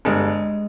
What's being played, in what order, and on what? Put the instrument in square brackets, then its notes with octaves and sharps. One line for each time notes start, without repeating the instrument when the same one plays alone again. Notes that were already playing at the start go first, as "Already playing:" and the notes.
[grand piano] G1 [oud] G#3